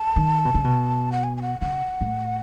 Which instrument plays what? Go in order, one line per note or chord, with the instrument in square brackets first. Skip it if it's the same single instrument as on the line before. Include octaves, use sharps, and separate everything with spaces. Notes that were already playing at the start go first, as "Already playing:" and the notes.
Already playing: [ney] A5
[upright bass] D#3
B2
C#3
B2
[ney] F#5
G#5
G#5
F#5
[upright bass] C#3 [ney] F#5
[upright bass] A2